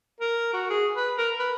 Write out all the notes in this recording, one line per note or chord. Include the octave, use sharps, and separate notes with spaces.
A#4
F#4
G#4
B4
A#4
B4